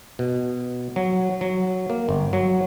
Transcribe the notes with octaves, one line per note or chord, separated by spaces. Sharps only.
B2
F#3
F#3
A#3
G1
F#3